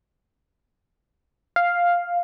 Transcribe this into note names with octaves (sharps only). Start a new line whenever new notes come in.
F5